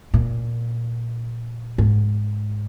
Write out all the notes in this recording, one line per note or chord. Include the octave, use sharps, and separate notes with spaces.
A#2
G#2